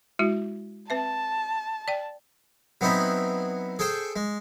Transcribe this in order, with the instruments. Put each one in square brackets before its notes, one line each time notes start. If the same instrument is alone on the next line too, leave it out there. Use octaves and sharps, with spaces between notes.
[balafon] G#3 E4 F#4
[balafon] C4 B4 E5 [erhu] A5
[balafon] D5 G5
[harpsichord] F#3 B3 C4 D#4 E4
G#4 A4 C5 G5
G#3